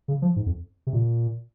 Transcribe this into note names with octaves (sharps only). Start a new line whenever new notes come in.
C#3
F3
G#2
F2
C3
A#2